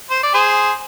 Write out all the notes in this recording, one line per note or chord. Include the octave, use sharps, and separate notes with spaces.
C5
D5
G#4 C5